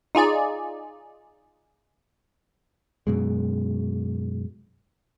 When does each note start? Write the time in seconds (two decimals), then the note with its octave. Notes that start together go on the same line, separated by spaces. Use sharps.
0.15 D#4 F4 G#4 D5
3.07 F#2 B2 G#3